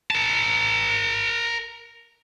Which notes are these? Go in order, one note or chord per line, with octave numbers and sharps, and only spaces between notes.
A#4 A5